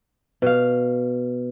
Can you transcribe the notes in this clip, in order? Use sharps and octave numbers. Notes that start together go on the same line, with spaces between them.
B2 F5